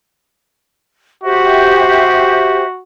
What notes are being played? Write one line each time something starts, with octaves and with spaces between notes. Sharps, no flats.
F#4 G4 C5 E5